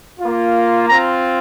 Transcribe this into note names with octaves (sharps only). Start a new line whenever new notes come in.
A#3 F4
C4 F4 A#5